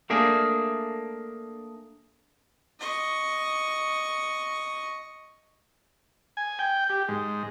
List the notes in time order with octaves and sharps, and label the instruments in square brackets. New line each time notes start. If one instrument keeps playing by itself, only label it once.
[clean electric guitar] A3 A#3 D4 G#4
[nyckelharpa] D#5 C#6
[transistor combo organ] G#5
G5
G4
G#2